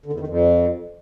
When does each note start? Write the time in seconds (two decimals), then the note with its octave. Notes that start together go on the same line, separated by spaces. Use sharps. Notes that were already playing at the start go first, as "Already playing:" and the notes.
0.06 D3
0.13 E2
0.20 D#3
0.27 F2